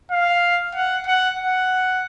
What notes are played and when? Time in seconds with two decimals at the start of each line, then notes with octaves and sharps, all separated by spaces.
0.11 F5
0.75 F#5
1.07 F#5
1.39 F#5